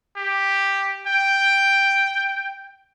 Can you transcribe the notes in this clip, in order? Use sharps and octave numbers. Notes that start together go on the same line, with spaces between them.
G4
G5